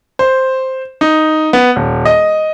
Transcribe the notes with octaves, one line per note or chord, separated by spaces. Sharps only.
C5
D#4
B3
D#1
D#5